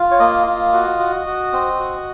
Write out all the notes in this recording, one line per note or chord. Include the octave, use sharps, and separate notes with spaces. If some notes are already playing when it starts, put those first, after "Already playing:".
Already playing: F4
C#5
A#3 D#5
F4
F#4
F#4
F#4
C4
F#4